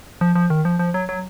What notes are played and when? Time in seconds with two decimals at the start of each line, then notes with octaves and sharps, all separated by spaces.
0.21 F3
0.35 F3
0.50 D#3
0.65 F3
0.79 F3
0.94 F#3
1.09 F#3